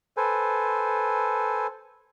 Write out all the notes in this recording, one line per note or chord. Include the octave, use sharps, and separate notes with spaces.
A4 B4 C5 G#5